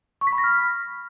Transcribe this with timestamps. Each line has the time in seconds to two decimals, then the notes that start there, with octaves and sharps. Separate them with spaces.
0.21 C#6
0.27 B6
0.33 B5
0.38 A#6
0.44 F6